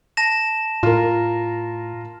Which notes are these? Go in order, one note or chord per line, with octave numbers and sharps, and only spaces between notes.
A5 A#6 E7
A2 F4 A#4